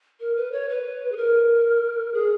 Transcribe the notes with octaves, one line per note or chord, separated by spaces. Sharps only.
A#4
B4
C#5
B4
G#4
A#4
G#4